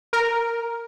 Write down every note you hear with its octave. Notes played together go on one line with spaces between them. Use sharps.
A#4